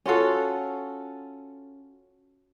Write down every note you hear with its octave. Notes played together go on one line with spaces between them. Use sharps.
C#4 F4 F#4 A4